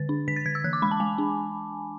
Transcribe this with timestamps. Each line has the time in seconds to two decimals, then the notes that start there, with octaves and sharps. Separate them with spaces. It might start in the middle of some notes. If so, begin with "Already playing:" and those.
Already playing: D3 A6
0.09 D4
0.28 D3 B6
0.36 A6
0.46 D3 G#6
0.55 E6
0.64 E3 F#6
0.73 D6
0.82 G#3 B5
0.91 A5
1.00 G#3 G#5
1.18 D4